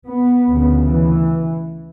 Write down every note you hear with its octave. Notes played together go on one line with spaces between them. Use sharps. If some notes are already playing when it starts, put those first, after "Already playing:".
B3
D2 C#3
E3